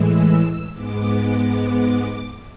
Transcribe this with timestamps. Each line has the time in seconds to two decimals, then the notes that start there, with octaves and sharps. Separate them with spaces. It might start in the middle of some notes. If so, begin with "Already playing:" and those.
Already playing: A2 E3 G#3 E6
0.72 G#2 G#3 B3 D6